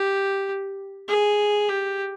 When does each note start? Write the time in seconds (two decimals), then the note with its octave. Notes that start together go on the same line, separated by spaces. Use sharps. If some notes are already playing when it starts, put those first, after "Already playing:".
Already playing: G4
1.08 G#4
1.68 G4